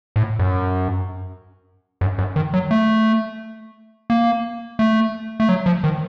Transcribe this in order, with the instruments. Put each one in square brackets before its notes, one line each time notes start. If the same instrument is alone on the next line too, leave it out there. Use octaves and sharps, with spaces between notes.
[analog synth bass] A2
F#2
F#2
F#2
D#3
F#3
A3
A#3
A3
A3
F#3
F3
D#3